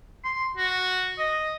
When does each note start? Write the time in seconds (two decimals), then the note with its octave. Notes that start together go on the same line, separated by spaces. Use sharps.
0.24 C6
0.57 F#4
1.18 D#5